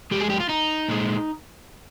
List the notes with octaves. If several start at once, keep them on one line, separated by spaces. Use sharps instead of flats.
F2 C#3 G#3 G4
G#4
G4
F4
D#4
A#2 G#3